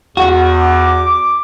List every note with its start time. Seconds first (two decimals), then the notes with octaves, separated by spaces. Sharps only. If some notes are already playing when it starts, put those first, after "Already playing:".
0.17 E2 F#4
0.61 D6